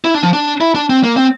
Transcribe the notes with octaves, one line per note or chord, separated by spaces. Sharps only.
E4
D4
F3
D4
E4
D4
C4
A#3
C4